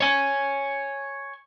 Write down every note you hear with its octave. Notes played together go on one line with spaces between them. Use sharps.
C#5 G#5